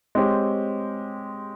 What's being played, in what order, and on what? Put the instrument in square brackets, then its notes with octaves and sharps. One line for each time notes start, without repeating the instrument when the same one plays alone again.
[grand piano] G#3 C4 G4 C#5